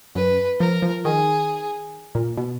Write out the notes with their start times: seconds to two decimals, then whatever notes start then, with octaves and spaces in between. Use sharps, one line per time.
0.15 F#2 B4
0.60 F3 A#4
0.82 F3
1.04 D#3 G#4
2.15 A#2
2.37 B2